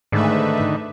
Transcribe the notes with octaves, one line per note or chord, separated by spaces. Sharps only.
G#2 D3 D#3 A3 B4 E5